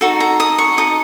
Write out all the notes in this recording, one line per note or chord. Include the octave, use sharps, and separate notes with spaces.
D#4 F#4 A4
A#5
D#6
C#6
D#4 A4 D#6